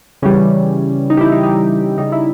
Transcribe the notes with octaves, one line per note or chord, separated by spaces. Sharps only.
C#3 E3 G3 C#4
D#4
G4
E4
D#4
D#4
C#3 G3 D#4
E4